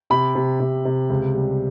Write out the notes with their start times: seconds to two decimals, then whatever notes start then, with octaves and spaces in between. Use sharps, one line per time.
0.10 C3 B5
0.35 C3
0.60 C3
0.85 C3
1.10 C#2
1.34 G3